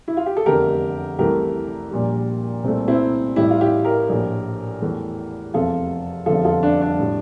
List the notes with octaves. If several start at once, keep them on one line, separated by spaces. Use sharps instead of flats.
E4
F4
G4
A4
F1 E2 D3 A3 G4 A#4
C2 C3 E3 A3 G4 A#4
A#1 A#2 G3
C2 A#2 A3 C4
C4 E4
A1 A2 G3 E4 G4
F4
E4 G4
G4 A#4
A#1 A2 F3 A3
E2 E3 A3
F1 E2 C3 F3 F4 A4
F1 E2 D3 F3 F4 A4
F4 A4
D4
D4
A2 G3